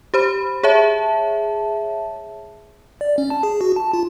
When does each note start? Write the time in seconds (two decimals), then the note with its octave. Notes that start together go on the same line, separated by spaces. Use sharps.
0.14 G4 C5 B5
0.63 G#4 C#5 E5 A5
3.01 D5
3.18 C#4
3.30 A5
3.43 G#4
3.61 F#4
3.76 A5
3.93 F4